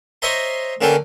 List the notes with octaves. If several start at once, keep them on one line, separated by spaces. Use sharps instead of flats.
C5 C#5 D#5 E5 A#5 C6
D3 A#3 C#4 A4 B4 G5